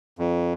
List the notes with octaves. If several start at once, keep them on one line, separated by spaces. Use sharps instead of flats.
F2